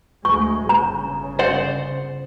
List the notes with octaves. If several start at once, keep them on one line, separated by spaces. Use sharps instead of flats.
D2 G#3 C#6
G1 C#3 A#5
C5 D5 F#5